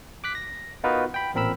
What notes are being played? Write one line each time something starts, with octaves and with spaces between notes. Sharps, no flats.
D6 F#6 B6
A#6
B3 D#4 F4 F#4 A#4 B4
G5 B5
A1 A#2 C4 A#4 B5 E6